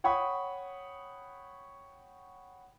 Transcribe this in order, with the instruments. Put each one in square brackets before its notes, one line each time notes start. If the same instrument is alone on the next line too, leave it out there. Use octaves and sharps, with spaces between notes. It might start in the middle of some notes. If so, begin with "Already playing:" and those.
[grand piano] C#5 F#5 G5 B5 C#6 D#6